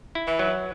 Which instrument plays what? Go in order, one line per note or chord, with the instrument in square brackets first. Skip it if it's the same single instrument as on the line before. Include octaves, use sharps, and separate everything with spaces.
[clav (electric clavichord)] E4
[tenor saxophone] E3
[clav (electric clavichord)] F#3